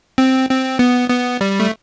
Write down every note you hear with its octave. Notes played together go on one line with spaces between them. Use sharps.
C4
C4
B3
B3
G3
A3